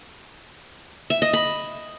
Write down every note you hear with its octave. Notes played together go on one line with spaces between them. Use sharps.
E5
D#5
B5